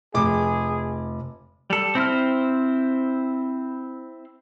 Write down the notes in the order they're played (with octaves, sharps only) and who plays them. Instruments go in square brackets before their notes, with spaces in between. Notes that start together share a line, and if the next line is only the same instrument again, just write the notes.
[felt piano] F1 D6 [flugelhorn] G#4
[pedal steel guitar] G3 A4
C4 E4 C5 F6